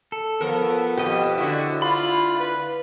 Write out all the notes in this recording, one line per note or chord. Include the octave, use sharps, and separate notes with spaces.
A4
F3 B3 A#4
F2 B2 G4 D#5
D3 E4 F#4
F4 B5
B4